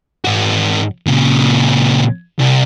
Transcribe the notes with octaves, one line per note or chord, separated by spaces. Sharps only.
G#2 F#4
A#2 C#3
C2